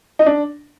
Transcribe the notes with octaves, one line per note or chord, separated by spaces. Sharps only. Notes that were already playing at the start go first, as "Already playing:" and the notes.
D#4
D4